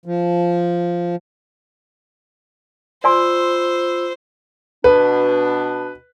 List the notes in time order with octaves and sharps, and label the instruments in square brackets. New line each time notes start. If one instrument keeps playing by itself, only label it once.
[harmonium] F3
[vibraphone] F4 B5 E6 [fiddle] C5 [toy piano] D5 G#5 C6
[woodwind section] B2 D4 [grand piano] B4